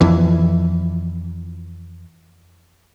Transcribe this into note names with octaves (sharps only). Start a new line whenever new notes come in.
F2 E3